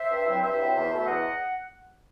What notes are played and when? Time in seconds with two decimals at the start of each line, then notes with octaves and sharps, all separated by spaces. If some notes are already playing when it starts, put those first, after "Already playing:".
Already playing: C5 E5
0.09 G2
0.26 F#3 C4 E4
0.42 G2 C5 E5
0.58 F#3 C4 E4
0.74 E2
0.90 B2 A3
1.06 E2 D#5 F#5